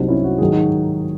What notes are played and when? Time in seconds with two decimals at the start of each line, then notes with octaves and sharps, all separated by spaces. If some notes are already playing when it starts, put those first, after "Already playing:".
Already playing: C2 C3 F#3 C4 D#4
0.08 C#4 E4
0.24 F#4
0.38 G#2 D#3 F#3 G#4
0.52 D#4 F#4